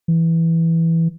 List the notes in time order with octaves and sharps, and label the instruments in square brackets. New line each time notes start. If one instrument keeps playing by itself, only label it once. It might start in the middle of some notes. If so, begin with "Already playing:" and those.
[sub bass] E3